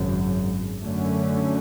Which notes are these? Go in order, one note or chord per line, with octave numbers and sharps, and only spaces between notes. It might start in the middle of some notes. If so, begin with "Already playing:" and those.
Already playing: G#1 F#2 C#3
F#2 D3 A3 C#4